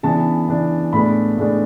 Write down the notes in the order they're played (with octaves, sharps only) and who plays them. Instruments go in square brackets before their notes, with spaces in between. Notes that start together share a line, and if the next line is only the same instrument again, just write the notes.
[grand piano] C#3 E3 B3 D4 A5
C#3 E3 B3 D4
A2 G#3 B3 D4 B5
A2 G#3 B3 D4